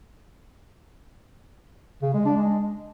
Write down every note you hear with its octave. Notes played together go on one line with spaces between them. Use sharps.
C#3
G#3
D4
G#3